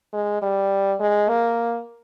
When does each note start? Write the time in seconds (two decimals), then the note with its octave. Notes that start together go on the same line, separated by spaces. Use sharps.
0.13 G#3
0.42 G3
1.00 G#3
1.29 A#3